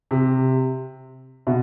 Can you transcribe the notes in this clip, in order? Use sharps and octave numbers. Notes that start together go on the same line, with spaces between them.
C3
B2